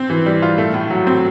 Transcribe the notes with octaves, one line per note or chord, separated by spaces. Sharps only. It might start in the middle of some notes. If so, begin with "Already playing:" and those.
Already playing: C4
E3
G3
F4
A3
A2
F#3
C4